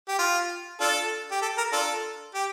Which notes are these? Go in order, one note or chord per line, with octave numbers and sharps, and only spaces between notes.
G4
F4
D4 F4 A4
G4
A4
A#4
D4 F4 A4
G4